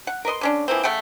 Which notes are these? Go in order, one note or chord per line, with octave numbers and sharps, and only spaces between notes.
F#5
A#4 B4 D#5 C6
D3 C#4 D4
E3 F3 A#3 C4
C#3 A3 F#5 G5